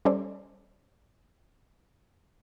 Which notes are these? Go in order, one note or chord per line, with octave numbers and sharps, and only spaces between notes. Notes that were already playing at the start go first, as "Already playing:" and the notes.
G3 C#4 A4 C5 D5